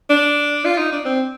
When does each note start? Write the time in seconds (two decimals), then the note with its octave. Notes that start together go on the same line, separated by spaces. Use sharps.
0.10 D4
0.65 F4
0.78 D#4
0.92 D4
1.05 C4